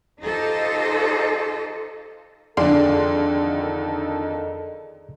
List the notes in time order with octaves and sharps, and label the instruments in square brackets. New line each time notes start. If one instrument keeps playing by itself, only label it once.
[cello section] D#4 F4 G4 A4 C5 D#5
[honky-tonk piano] F2 D3 [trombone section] D#3 D#4 A4 [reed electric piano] G#4 D5 C6